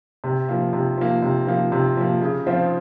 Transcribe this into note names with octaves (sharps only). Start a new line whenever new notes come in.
C3
F3 A#3
C3
F3 A#3
C3
F3 A#3
C3
F3 A#3
C#3
F3 C4 F4